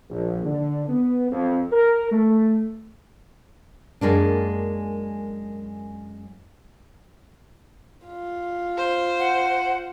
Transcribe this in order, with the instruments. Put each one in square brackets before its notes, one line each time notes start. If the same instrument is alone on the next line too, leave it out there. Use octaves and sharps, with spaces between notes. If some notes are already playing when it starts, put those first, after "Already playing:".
[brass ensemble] A#1
D3
B3
F2
A#4
A3
[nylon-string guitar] F#2 G#3 A#3 D4
[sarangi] F4
[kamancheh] C5
[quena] F#5